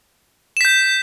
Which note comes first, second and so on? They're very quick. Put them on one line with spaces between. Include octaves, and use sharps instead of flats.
E7 B6 G6